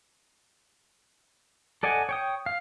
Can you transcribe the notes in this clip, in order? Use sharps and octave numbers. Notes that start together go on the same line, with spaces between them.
A4 D5 D#5 F#5 G#5
C#5 G5 D#6
F5